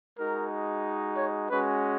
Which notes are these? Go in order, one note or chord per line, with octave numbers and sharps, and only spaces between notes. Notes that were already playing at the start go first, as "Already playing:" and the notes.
G#3 D#4 F#4 A#4
C#5
G#3 C#4 F#4 B4